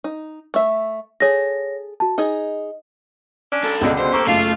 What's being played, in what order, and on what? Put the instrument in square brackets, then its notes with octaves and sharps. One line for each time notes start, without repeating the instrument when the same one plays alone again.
[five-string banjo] D#4
A3 E5
[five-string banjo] G#4 A4 [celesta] C#5 A#6
[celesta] F#4 A5
[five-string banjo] D#4 G#4 [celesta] D#5
[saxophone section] C#4 D4
[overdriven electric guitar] C2 A4
[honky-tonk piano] C#2 B2 D#5 [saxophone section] D3
[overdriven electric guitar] C5
[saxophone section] A#3 G4 A4 [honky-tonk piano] C#6 D6
[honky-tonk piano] F#1 B1 [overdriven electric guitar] A3 [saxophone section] F4 F5